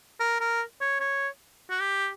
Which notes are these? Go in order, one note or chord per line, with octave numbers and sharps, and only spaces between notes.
A#4
A#4
C#5
C#5
F#4
G4